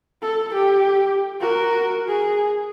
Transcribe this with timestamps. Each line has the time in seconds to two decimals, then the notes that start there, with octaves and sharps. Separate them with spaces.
0.22 A4
0.54 G4
1.41 F#4 A#4
2.08 G#4